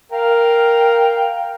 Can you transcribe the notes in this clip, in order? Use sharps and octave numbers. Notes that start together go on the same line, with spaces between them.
A#4 F5 G5